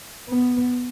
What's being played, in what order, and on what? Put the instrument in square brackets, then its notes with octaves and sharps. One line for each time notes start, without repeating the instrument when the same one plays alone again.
[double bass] B3